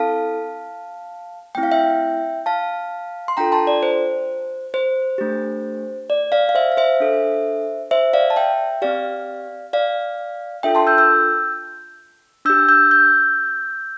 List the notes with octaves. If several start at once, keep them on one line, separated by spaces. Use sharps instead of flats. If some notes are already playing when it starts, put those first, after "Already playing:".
Already playing: C4 E4 A4 F5 A5
A3 C4 E4 G5
F5
E5 G5
F5 A5
C6
D4 F4 A4 G5 A#5
A5 C6
D5
C5
C5
A3 D4 G4
D5
D5 F5
F5
C5 E5
F5
C5 E5
D4 A4
C5 E5
D5 F5
A5
E5 G5
C4 G4 D5 F5
D5 F5
D4 F4 A4 E5 G5
A5 C6
E6 G6
E6 G6
D4 G4 E6 G6
E6 G6
E6 G6